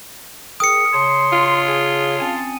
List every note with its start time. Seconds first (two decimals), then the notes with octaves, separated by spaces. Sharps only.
0.60 G#4 A#4 G5 D#6 C#7
0.93 C#3 C#5 A5 C6
1.32 F4
1.67 G#4
2.20 C4 C#4 G#5 A5